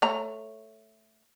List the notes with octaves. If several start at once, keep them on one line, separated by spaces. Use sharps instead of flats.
A3 C#5 A#5